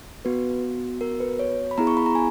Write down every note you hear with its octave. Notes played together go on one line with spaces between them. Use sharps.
B3 F#4 B4
A#4
B4
C#5
B5
B3 E4 G#4 A#5
C#6
B5
A#5
G#5